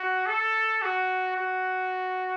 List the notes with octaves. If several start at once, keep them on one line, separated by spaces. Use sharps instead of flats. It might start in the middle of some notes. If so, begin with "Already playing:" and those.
Already playing: F#4
A4
F#4
F#4